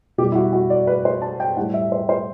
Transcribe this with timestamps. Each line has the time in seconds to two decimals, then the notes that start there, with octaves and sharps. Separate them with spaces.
0.18 B2 G4
0.23 G3
0.32 E4
0.35 F#4
0.53 F#4
0.70 D5
0.87 B4
1.05 C5
1.22 A5
1.40 G5
1.56 A2 E3 G3 F#5
1.74 E5
1.92 C5
2.09 C5